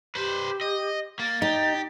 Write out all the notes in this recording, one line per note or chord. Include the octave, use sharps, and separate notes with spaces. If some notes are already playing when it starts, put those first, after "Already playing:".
G4 B4 C5
D#5
A#3 A6
D#4 G4